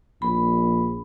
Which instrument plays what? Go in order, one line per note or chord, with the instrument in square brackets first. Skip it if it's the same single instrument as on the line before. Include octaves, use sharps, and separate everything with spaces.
[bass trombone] A#1 [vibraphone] B5